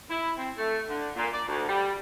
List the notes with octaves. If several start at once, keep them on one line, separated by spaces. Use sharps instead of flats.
E4
C4
A3
D3
A#2
D5
D2
G3